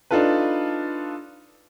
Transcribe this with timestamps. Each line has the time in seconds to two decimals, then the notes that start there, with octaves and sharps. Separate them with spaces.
0.11 D4 D#4 F4 A4 B4